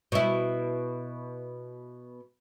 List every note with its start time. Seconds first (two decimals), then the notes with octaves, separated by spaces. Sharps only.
0.12 B2 E4